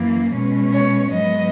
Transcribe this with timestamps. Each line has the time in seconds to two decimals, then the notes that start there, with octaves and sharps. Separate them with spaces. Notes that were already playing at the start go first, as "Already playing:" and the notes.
Already playing: F#2 E3 A#3
0.34 B2 G#3 C#4
0.72 C#5
1.10 G#2 F#3 B3 D#5